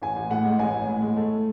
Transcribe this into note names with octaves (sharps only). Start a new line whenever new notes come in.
A1 G#5
A1
A2 F#5
G#3
A1 G#5
A1
A2
G#3
A3